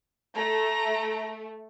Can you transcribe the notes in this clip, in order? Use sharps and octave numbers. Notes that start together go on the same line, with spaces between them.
A3 A#5